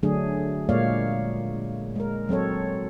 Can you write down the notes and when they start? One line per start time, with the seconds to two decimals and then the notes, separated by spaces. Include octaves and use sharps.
0.03 D3 F#3 A3 D4 G#4
0.69 A#2 G#3 A#3 C#5 D5 F5
1.95 G#3 A#4
2.29 F#3 C4 A4 C#5